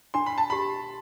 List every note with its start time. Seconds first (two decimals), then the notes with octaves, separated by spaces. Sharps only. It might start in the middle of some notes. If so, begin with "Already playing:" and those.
0.14 D4 C6
0.26 B5
0.38 A5
0.50 G4 B5